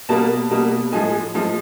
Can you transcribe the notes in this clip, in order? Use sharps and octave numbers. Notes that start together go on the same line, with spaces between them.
B2 G3 A#3 A5
B2 G3 A#3
A2 F3 G#3 G#5
A2 F3 G#3